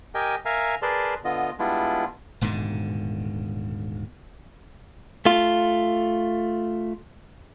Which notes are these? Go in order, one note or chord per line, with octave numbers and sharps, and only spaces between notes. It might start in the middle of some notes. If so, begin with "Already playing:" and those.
G4 A#4 D#5 G5 G#5
A#4 E5 F5 G#5 A#5
G#4 A#4 B4 D5 A5 C6
D3 B3 F4 D#5
G3 G#3 B3 D4 E4 F4
D#1 G#2 B2 D3
A3 F4